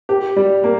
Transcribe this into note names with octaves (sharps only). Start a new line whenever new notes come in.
G4
G3
A#3